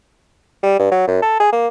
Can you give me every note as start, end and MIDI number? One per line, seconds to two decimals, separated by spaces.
0.63 0.76 55
0.79 0.91 43
0.91 1.06 54
1.07 1.21 42
1.22 1.38 69
1.40 1.52 68
1.53 1.67 58